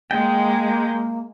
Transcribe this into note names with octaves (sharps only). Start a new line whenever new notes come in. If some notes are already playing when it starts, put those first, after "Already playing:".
G#3 A#3 G5